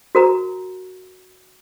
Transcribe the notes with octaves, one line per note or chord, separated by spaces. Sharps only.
F#4 A#4 A#5